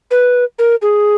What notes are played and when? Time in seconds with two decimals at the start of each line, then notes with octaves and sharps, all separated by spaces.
0.11 B4
0.59 A#4
0.82 G#4